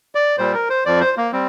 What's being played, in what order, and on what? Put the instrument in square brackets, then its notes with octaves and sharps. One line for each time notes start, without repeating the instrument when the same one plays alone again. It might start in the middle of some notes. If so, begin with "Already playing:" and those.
[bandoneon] D5
A#2 G3 C5
A#4
C5
F2 F3 D5
C5
A#3
G3 C4